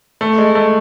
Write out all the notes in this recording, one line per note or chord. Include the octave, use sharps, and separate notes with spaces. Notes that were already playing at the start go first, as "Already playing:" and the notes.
A3
G#3
A3